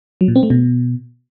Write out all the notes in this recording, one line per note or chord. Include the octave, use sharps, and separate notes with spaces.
F#3
A#2
C4
A3
B2